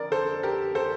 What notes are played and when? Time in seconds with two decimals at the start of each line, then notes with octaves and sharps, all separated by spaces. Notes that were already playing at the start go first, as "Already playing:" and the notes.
Already playing: F2 D3 A#4 D5
0.12 A4 C5
0.43 G4 A#4
0.75 A4 C5